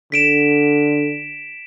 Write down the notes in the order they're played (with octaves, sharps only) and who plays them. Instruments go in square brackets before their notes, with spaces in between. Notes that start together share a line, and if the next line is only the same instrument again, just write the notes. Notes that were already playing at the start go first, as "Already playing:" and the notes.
[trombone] D3 [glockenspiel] B6 D7 E7